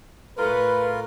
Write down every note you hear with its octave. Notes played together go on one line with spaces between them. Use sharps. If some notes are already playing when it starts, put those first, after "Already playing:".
A2 A3 F4 A#4 B4